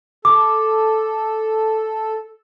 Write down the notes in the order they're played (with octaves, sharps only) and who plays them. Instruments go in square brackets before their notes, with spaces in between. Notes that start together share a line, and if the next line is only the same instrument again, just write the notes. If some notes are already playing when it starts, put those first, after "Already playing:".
[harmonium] A4 [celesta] D6